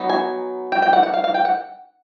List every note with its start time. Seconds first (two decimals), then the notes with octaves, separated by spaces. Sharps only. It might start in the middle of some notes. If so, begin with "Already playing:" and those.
Already playing: F#3 B3 D#4
0.09 G#5
0.72 G5
0.82 G5
0.93 F#5
1.03 F#5
1.14 F5
1.24 F5
1.34 G5
1.45 F#5